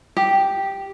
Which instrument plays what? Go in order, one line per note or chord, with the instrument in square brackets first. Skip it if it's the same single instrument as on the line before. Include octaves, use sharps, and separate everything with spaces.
[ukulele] G4